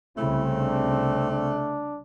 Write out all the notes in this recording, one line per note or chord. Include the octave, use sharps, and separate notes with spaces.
C2 C#3 A3 C4 E4
D4
D4